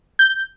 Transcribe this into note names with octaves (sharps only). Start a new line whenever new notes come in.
G6